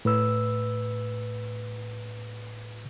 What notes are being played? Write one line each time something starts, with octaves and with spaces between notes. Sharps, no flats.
A2 B4 E6